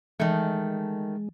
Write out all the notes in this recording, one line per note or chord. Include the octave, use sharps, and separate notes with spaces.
D#3 E3 G#3 A3